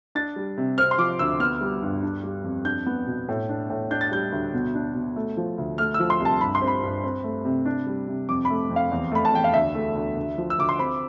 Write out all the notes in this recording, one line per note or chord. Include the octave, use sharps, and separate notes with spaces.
D4 A6
G3
C3
C4 F6
C6
F3 D6
D2 E6
B3 F6
G3
G2
D4
G3
F2
D4 G6
B3
B2
A2
D4
A2
D4 G6
A6
G3 G6
D2
B2
D4
B2
A3
F3
D2
A3 F6
F3 E6
C6
C2
A5
G2 B5
C6
C4
B5
G2
C4
A3
C3
D4
G3
C3
F2 D6
B5
A3
F2
F5
E2
A3 B5
A5
E2 G5
F5
D2 E5
A3
D2
D2
F3
E6
D2 D6
C6
C4 B5